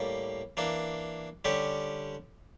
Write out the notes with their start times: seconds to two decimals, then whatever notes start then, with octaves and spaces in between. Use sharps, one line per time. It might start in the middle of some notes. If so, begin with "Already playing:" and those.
Already playing: A2 G3 A#3
0.57 E3 A#3 D4
1.45 D3 G3 C#4 G4